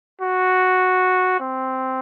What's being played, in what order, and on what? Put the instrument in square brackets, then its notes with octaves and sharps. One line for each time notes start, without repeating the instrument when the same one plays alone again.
[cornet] F#4
C4